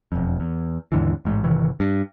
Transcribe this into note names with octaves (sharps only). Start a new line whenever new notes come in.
E1 F2
E2
D#2 G#2 D3 E3
A1 G#2
G1 C3 D#3 E3
G2